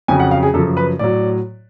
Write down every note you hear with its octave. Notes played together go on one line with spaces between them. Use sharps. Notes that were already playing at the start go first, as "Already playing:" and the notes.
F2 C#3 F#3 G#5
F#5
F5
G#4
F#2 C#3 F3 A4
B4
A2 F#3 D5